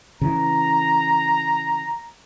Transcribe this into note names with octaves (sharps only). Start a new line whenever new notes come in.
C#3 E3 A#5